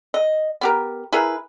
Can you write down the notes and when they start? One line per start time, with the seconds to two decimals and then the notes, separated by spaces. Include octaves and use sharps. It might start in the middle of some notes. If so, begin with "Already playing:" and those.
0.14 D#5
0.61 B3 G4 A#4
1.12 E4 G#4 A#4 B4